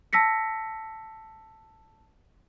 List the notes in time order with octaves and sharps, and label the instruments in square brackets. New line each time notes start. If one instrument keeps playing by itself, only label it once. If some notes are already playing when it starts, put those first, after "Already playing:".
[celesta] A5 E6 A#6 B6 C#7